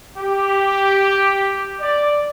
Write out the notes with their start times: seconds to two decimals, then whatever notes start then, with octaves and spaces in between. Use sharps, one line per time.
0.18 G4
1.80 D5